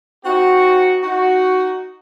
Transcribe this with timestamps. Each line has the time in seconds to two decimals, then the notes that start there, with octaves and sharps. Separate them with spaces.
0.24 C4 D#4 F#4
1.03 D#4 F#4